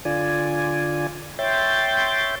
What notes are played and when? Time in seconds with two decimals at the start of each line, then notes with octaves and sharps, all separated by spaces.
0.05 D3 F4 D5 G#5
1.39 C#5 E5 G5 C6 G6 A6